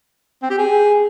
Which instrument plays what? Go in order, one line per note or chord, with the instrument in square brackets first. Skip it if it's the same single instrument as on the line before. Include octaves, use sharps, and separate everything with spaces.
[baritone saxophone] C4
G4
G#4